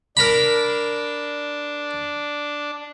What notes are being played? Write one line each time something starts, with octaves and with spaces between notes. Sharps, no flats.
D4 A#4 A#5 B5